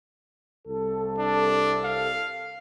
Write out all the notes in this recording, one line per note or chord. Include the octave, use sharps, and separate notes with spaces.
C2 A4
D4
F5